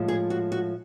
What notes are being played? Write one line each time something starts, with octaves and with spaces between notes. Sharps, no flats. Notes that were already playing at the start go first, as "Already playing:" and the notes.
Already playing: A2 F3 G#3
G#4
F#4
F#4